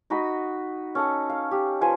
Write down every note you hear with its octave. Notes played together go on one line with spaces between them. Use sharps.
D#4 F#4 D#5 B5
C#4 A4 F#5
F5
G4
F3 B4 G#5